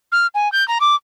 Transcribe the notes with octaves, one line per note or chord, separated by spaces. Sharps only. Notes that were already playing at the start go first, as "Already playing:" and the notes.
F6
G#5
G6
A#5
D6